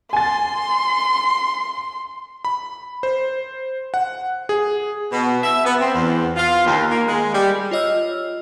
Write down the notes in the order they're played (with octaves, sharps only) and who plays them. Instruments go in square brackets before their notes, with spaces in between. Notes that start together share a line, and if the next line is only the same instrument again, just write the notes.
[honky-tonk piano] G#5 A6 [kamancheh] C6
[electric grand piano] B5
C5
F#5
G#4
[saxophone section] B2
E5
B3
C4
E2
F4
D#2
A#3
G#3
G3
[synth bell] F4 C#5 D#5 E6 F6